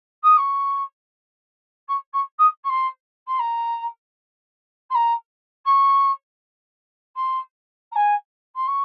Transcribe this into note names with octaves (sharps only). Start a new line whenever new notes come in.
D#6
C#6
C#6
C#6
D#6
C#6
C6
C6
A#5
C6
A#5
C#6
C6
A#5
G#5
C6
C#6